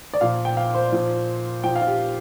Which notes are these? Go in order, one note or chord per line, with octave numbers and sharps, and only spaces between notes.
D5
A#2 F3 F5
G5
F5
C5
A#2 F3
A#2 F3 G5
F5
F4
G4